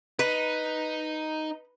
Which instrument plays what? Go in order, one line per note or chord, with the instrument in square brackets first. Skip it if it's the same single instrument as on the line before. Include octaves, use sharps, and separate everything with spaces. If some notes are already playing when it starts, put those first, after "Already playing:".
[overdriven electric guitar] D#4 [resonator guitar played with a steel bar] B4